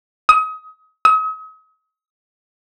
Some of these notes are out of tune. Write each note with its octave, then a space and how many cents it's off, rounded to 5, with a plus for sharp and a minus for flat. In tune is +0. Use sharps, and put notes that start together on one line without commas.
D#6 +30
D#6 +40